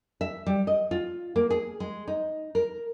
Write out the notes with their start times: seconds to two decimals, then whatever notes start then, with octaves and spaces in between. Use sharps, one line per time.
0.21 E5
0.46 G3
0.67 D#5
0.91 F4
1.36 A#3
1.50 G#4
1.80 G#3
2.07 D#4
2.55 A#4